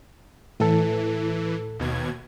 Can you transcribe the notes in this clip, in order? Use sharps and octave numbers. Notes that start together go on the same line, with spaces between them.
A2 E3 A4
D#2 B2 G#6